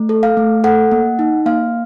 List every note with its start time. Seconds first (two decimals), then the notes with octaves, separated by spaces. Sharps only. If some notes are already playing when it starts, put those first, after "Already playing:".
Already playing: A3
0.09 A4
0.23 F5
0.37 A3
0.64 A4 F#5
0.92 A#3
1.19 D#4
1.46 A#3 F5